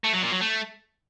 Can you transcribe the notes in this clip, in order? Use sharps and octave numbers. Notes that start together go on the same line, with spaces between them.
A3
F#3
A#2
F#3
A3